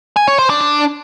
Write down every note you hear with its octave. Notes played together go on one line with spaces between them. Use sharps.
G#5
C#5
C5
D4
D4